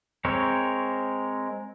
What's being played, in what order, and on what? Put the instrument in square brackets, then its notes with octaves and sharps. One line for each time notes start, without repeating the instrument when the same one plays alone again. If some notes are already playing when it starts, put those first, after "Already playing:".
[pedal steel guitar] G#3 C4 A#4 C#5